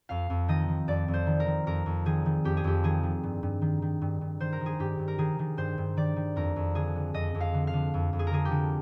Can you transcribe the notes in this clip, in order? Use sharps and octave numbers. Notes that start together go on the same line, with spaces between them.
F2 F5
F2
D#3 D#5
D#3
F2 D5
F2
C5
D#3
A#4
D#3
F2 A#4
F2
D#3 G#4
D#3
F2 G4
G#4
F2 G4
D#3 G#4
D#3
G2
G2
D#3
D#3
G2
G2
D#3 C5
A#4
D#3
G#4
G2 G4
G2
A#4
D#3 G#4
D#3
G2 C5
G2
D#3 D5
D#3
F2 A#4
F2
D3 G#4
D3
F2 D#5
F2
F5
D3
F5
D3
F2
F2
G#4
A#4
D3 G#4
G4
D3